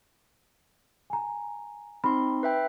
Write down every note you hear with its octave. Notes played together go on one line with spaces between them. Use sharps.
G#5 A#5
C4 D#4 B5 C6
B4 E5 G5